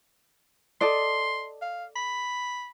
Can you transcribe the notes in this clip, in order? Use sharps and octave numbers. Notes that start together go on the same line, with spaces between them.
A4 D5 D#5 C6
F5
B5